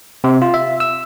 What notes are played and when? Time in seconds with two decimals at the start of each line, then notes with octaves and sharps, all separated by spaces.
0.24 C3
0.42 F4
0.54 E5
0.80 E6